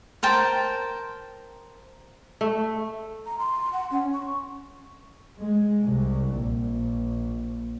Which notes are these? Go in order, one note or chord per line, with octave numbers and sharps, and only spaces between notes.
A#4 C5 G5 A5
A3
A#5
C6
F#5
C#4
C#6
G#3
C2
A#1